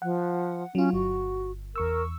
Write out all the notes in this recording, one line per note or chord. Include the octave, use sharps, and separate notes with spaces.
F3 F#5
F#3 C#4 F4
G1 F#4
E2 A#4 C#6 E6